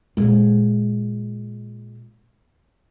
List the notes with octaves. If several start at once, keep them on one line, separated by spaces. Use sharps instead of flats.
A#2 G#3